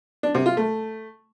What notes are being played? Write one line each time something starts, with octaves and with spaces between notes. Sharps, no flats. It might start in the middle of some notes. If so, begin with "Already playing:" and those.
D4
C3
F4
A3